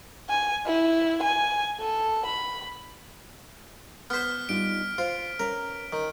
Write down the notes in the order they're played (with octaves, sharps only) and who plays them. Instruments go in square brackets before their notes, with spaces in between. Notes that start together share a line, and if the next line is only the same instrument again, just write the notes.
[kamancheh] G#5
E4
G#5
A4
B5
[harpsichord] B3 C5 [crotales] F6 B6
[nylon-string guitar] G3 D#4 F4 [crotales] D7
[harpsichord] F4 [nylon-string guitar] C5
[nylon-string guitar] C#4 B4 [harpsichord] A#4
[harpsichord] D#3